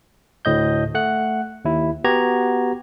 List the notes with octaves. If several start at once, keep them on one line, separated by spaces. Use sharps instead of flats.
D2 A2 D#5 G6
A3 F#5 F#6
D#2 E4
B3 F#4 G4 A#5 G#6